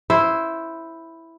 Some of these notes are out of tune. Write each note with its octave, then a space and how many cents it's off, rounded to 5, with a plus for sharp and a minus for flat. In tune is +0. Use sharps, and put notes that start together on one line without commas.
E4 +0 C5 +0